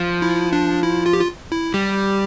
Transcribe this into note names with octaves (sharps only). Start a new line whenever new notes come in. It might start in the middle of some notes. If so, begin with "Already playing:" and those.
Already playing: F3
E4
D4
E4
F4
G4
F4
E4
G3 G4